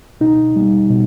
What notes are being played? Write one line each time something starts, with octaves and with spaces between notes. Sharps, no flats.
B2 D#4
G3 A#3
B2